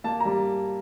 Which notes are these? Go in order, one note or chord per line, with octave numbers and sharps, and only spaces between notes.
A#3 A5
G3 A#5